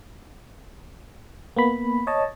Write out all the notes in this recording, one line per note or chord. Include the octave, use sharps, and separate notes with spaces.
A#3 B3 B5
C#5 D#5 A5